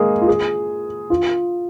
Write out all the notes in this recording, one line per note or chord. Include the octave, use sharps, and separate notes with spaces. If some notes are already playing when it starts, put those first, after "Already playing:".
Already playing: G#3 A#3 G#4
F4
G#4
F4